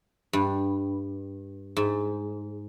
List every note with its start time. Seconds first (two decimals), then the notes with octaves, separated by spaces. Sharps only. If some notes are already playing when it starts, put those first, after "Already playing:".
0.33 G2
1.77 G#2